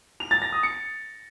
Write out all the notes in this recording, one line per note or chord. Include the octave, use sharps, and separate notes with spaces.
F7
A6
A#6
D#6
C#7